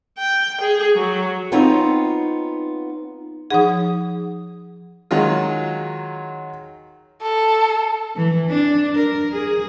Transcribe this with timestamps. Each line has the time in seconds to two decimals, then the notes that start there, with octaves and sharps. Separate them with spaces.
0.18 G5
0.61 G#4
0.96 F#3
1.52 B3 C4 D#4 F4 C#5
3.50 F3 D#4 G#4 F#5 D#6
5.11 D#3 F#3 G#3 F4
7.22 A4
8.15 E3
8.49 D4
8.94 A#4
9.32 G#4